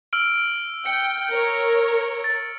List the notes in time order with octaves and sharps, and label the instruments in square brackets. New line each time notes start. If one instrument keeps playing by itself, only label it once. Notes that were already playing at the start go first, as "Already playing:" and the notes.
[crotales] E6 F6 D7
[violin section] G5 [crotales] C#7
[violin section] A#4 C#5
[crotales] A6